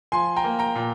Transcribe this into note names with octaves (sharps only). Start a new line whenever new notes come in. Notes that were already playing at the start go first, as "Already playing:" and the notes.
F3 G#5 C6
G5 A#5
A#3
G5 A#5
A#2